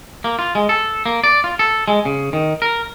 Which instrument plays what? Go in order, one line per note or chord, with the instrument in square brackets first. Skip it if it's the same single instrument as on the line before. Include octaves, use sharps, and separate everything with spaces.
[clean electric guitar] A#3
F4
G#3
A4
A#3
D5
F4
A4
G#3
C#3
D#3
A#4